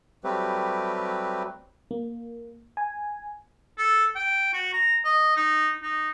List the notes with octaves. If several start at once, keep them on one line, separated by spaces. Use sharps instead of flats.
F#3 G3 A3 C4 G4 B4
A#3
G#5
A4
G5
F#4
A#5
D#5
D#4
D#4